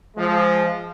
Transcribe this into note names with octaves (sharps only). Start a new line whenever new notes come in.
F3 G#3